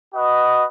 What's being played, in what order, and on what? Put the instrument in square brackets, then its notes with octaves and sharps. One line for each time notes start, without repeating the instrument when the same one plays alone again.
[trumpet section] F#4 B4 D#5